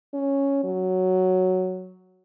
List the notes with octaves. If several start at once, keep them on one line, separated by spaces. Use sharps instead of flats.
C#4
F#3